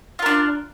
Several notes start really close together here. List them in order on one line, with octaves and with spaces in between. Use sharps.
F4 A#4 D4